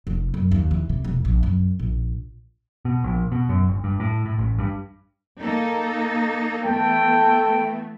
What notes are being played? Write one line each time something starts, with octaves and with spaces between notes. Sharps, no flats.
F1
F#2
D#2
E3
C3
E1
A#1
F#2
A#1
B2
A#1
B2
F#2
G1
G2
A2
A2
A1
G2
A#3 D#4 A4
E3 A3 B3 A4 G5